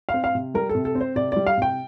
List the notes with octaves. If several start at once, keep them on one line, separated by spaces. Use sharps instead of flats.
F5
C4
F5
C3
G3 A#4
A4
C3
A4
C4
C5
C3 D5
G3 D5
F5
C3 G5